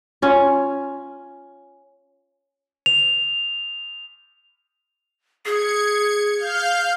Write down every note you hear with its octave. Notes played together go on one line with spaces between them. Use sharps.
C#4 F4
F7
G#4 G#6 C#7
F5 F6 G6